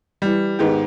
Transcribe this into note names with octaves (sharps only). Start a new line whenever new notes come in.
E3 G3
G#2 D#3 G#3 B3 G4